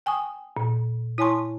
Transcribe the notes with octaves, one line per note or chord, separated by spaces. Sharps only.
G5 G#5 C#6 D#6
A#2
E4 C#5 G#5 A5 C6 C#6